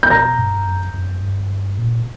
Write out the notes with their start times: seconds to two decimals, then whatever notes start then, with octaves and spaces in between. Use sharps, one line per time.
0.03 G6
0.10 B2 A#5 A#6
0.38 G2
0.66 F#2
0.94 F#2
1.22 G2
1.79 A#2